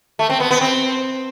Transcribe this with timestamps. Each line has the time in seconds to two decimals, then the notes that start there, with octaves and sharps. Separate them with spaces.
0.19 A3
0.30 C4
0.40 B3
0.51 B3
0.61 C4